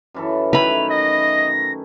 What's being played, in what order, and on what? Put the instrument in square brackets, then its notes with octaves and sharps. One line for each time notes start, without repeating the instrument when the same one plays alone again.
[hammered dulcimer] F#2 E3 A4
[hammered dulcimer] D#3 A3 E4 [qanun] B4 B5 [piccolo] F7
[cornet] D#5 [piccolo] A#6